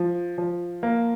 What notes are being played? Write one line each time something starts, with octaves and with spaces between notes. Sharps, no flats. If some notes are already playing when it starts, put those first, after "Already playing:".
Already playing: F3
F3
A#3